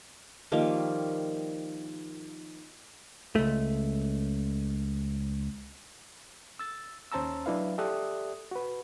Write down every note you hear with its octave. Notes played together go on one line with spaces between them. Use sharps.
D#3 F3 G3 A#3
C#2 A3
E6 A6
D#2 C#4 C5 A5 A#5 E6
F#3 D4 E4 B4 F5
G4 A4 D5 E5 D#6 F#6
F#4 B4